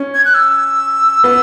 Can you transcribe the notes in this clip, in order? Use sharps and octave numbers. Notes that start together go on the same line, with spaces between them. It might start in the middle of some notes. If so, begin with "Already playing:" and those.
Already playing: C#4
G#6
F#6
E6
B3